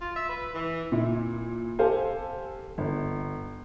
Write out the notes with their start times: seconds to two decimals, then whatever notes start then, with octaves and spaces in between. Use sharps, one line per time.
0.01 F4
0.16 E5
0.29 B4
0.54 E3
0.92 A#2 E4
1.79 G4 A4 C5 F5 G#5
2.78 G1